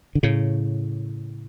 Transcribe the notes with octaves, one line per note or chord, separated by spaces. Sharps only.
D3
A2 C#3